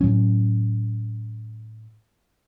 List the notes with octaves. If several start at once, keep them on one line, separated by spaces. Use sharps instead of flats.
A2 F#3 C#4